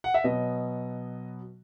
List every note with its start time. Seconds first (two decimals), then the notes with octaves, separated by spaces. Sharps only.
0.04 F#5
0.14 E5
0.24 B2 F#3 B3 D#5